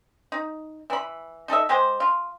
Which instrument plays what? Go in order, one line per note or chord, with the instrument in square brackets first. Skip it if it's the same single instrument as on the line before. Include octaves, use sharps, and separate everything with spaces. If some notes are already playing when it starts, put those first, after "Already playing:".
[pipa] D#4
E3 B5
D#4 A4 D#5 E5
G#3 G4 G#4 C5
F4